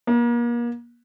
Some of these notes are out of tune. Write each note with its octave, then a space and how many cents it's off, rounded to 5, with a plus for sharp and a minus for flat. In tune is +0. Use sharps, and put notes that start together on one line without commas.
A#3 +35